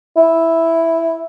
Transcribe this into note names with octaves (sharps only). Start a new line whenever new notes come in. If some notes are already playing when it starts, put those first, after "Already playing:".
E4